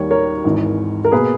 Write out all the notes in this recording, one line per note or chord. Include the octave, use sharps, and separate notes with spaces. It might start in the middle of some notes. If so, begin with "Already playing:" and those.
Already playing: D#2 D#3 G3 C#5
A#4 C#5
G#1 G#2 E3
A#4
B2 A#3 G#4 B4